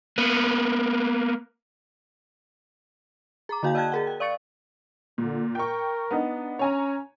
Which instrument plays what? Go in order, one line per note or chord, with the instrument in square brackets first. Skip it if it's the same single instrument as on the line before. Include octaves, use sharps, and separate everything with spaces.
[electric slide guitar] A#3 B3
[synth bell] G#4 A#5 D6
D3 A#3 F#4 F5 A5 G6
D5 D#5 G5 A5 F#6 G#6
G#4 A#4 F#5
G5
D5 F5 C#6 A6 C#7
[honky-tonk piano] A#2 [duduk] D3
[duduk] A#4 [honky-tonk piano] G5 C#6
[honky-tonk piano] B3 D4 D#4
[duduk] C#4 [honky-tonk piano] C#5 G#5 A#5